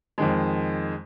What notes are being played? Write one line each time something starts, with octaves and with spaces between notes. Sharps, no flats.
F2 D#3 G#3